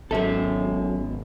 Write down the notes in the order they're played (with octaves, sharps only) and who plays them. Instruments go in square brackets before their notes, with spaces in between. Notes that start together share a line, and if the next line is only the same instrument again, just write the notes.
[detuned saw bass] G#1 [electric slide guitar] B2 E5 [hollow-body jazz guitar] F#3 A4 [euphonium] C#4